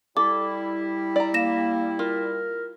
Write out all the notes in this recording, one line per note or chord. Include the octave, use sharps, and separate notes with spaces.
G3 E4 A4 D6
D5 A#5
A#3 A#6 E7
F4 A#4